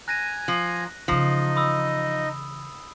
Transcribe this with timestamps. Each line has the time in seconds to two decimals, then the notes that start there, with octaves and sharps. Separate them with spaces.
0.08 G#5 A#5 F#6 A#6 D#7
0.48 F3
1.08 C#3 E3 F3 D#4 D#5
1.56 B5 D#6 E6